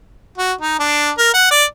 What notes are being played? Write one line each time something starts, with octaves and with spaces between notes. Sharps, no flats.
F#4
D#4
D4
A#4
F#5
D5